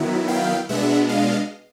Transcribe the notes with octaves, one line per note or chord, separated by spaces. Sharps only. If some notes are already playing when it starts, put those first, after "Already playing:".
Already playing: D#3 F#3 B3 E4
F5 G5
B2 G#3 B3 D4 E5 F#5
D#5 F5